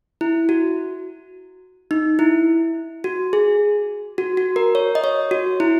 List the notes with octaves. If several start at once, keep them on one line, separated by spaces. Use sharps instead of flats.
E4
F#4
D#4
E4
F#4
G#4
F#4
F#4
A#4
C#5
D#5
C#5
F#4
E4